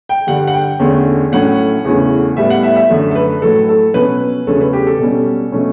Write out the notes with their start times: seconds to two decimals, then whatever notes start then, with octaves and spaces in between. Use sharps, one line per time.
0.09 G5
0.27 G2 D3 G3 F#5
0.47 F#5
0.54 G5
0.79 E2 D3 A3 C#4
1.32 A2 F#3 A3 C#4 F#5
1.85 E2 C#3 E3 A3 C#4
2.37 A2 G3 B3 E5
2.50 F#5
2.63 E5
2.76 E5
2.89 F#2 D3 A3
3.11 A4
3.15 B4
3.42 A2 F#3 A3 A4
3.69 A4
3.94 B2 F#3 C#4 B4
4.47 E2 C#3 F#3 A3 C#4 A4
4.61 B4
4.73 G4
4.87 A4
4.99 B2 G3 C#4
5.52 B2 F#3 A3 C#4